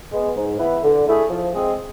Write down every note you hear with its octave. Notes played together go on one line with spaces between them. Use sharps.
G#3 B3
G#2
E3 B3 E4 B4
D3
A3 E4 G#4
F3
G#3 C4 G#4